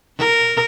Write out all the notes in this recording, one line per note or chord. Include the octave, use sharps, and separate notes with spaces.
A#4